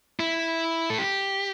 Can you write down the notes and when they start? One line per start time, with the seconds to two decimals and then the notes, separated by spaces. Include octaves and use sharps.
0.20 E4
0.90 A4
0.98 G4